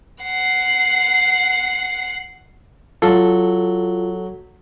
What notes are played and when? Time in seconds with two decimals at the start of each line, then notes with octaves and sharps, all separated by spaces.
0.23 F#5 C7
3.02 F#3 F4 A4